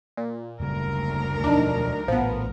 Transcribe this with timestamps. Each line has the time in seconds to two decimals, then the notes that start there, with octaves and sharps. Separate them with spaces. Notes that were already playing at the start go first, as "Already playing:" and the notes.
0.17 A#2
0.60 F#1 D2 C#3 F#3 G3 A#4
1.44 E1 B2 F3 D4 D#4
2.08 A#1 A2 F3 B3